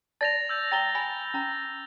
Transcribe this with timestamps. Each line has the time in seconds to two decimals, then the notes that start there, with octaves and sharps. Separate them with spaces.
0.21 D5 A5 A6 A#6 F7
0.49 E6 G6
0.72 G5 A#5 D#6 A6 G7
0.95 G#5 B5 A6
1.34 C#4 A#5